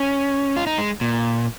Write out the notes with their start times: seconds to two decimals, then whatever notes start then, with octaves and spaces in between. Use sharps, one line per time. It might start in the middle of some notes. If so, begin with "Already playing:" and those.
Already playing: C#4
0.57 F4
0.67 D#4
0.78 G#3
1.01 A#2